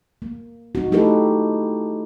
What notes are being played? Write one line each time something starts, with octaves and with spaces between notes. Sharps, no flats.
A#3
D#4 F#4
A3 D#4 E4 G4 A4 B4